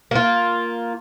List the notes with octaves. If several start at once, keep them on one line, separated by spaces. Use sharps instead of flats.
A#3 F4